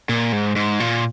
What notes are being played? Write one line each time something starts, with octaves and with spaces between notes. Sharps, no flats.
A#2
G#2
G#2
A#2